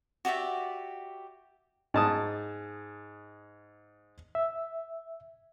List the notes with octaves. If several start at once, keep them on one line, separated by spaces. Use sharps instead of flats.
F#4 G4 D5 E5
G#2 A5 D#6
E5